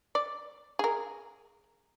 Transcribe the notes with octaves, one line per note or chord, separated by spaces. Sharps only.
D5
G#4 A#4